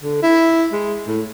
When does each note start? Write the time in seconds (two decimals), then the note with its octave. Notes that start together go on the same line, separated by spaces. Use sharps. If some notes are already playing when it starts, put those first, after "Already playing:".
0.03 D3
0.22 E4
0.72 G#3
1.07 A2